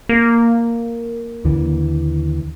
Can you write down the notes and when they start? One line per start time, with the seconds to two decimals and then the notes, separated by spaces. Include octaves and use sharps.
0.09 A#3
1.45 D#2 D3 E3